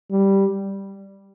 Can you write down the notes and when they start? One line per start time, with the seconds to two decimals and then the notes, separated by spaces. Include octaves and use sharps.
0.11 G3